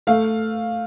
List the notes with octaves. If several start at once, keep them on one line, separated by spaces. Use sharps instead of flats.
A3 F5